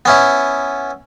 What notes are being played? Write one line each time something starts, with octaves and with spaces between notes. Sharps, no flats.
B3 C#4 E4